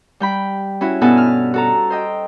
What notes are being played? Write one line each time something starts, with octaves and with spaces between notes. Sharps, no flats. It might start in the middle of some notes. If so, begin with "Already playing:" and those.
G3 G5 B5
C#4 E4 F#4
G2 B2 B3 A4 F#5 G#5
F6
F#4 A4 A#5
C5 D#5 G5